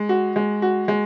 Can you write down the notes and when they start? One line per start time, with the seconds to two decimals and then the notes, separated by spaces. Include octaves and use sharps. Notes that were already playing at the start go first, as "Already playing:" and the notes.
Already playing: G#3
0.09 F#4
0.36 G#3
0.62 F#4
0.88 G#3